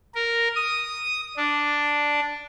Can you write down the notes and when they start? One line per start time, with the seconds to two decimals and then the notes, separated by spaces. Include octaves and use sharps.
0.15 A#4
0.55 D#6
1.37 D4